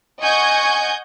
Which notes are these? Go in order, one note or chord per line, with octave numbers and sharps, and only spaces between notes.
D#5 F#5 G#5 C#6 G6 G#6